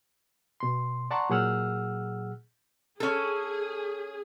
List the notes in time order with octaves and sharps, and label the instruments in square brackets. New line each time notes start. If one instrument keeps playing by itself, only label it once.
[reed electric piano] B2 C6
D5 F#5 A5 A#5 C6 C#6
A#2 F#3 G#4 F#5 E6 F6
[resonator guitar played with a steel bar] C#4 A4 [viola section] G#4